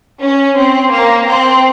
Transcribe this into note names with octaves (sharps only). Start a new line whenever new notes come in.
C#4
C4
A#3
C4